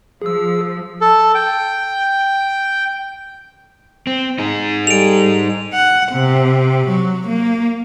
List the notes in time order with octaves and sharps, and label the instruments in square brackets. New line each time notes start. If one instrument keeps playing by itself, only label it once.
[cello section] F3 [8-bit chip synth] G#4 E6
[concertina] A4
G5
[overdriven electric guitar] C4
D#4 G#4
[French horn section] G3 G4 A4 [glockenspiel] D7 F7
[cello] F#5
C3
F#3
A#3